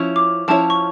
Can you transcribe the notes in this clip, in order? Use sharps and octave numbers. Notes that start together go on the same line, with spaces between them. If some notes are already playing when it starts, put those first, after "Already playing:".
Already playing: F3 C#4 E4 C#5
D6
F3 C#4 E4 A4 C#5 A5
C#6